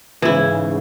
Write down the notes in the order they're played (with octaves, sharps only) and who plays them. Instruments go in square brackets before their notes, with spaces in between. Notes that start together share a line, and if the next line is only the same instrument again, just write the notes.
[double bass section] G#2 C#3 [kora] E3 E4